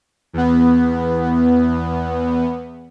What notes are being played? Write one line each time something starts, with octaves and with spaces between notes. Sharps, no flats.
E2 B3